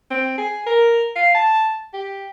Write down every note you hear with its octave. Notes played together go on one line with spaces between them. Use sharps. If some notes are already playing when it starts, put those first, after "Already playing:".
C4
G#4
A#4
F5
A5
G4